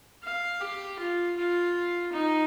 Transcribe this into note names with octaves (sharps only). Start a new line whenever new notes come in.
F5
G4
F4
F4
D#4